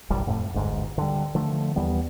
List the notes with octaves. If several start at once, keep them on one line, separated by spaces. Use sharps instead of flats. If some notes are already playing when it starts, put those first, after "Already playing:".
D1 G1 C2 G3
F2 A2 A3
G1 D2 G#2
D3 G3
D3 F3 A3
D#2 E3 G3 B3